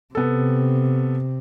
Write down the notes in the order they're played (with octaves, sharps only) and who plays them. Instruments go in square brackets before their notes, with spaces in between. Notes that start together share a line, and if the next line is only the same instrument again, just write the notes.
[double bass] C3 [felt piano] B3 A4